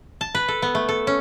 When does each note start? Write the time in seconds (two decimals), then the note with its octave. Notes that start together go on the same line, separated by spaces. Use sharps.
0.21 A5
0.35 B4
0.48 A4
0.62 B3
0.75 A3
0.89 A4
1.07 C#4